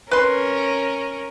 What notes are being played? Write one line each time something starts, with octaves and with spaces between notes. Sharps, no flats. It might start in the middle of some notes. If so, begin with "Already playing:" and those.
C#4 A#4 B4 C6